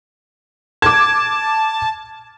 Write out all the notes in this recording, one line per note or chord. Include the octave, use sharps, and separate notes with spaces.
A5 D6 G#6